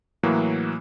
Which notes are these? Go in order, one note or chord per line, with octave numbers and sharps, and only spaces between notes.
A2 E3 F#3 A#3